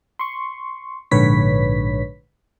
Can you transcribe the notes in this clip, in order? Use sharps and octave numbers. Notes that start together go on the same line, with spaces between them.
C6 C#6
A#1 G#2 D3 B4 C#5 B6